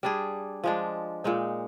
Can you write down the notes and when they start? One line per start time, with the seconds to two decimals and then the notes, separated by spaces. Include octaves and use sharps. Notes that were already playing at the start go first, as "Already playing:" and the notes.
0.03 G3 D4 G#4
0.64 F3 G#3 D4
1.24 A#2 G#3 D#4